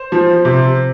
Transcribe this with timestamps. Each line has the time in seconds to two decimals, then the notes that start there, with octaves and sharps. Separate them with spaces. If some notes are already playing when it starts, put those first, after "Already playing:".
Already playing: C5
0.12 F3
0.45 C3